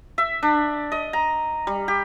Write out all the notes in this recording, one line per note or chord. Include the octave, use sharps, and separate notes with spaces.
E5
D4
D#5
A#5
G3
G4